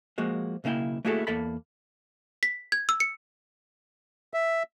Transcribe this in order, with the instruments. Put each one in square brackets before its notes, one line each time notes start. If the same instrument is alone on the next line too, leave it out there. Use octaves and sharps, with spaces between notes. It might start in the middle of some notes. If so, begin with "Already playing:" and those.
[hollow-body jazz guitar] F3 G#3 A#3 F#4
B1 C#3 A#3 E4 G5
A3 A#3 E4 F#4 G#4 A4
E2 A#3 A4 A5 B5
[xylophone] B6
G#6
E6
C#7
[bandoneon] E5